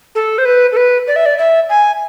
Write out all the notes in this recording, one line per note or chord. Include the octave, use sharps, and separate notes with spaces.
A4
C5
B4
A4
B4
D5
E5
D5
E5
G#5